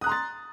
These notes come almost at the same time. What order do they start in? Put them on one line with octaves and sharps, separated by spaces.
D#6 F#6 A#5 C6 A6